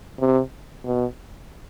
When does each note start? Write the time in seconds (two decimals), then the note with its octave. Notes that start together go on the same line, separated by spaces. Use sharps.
0.20 C3
0.85 B2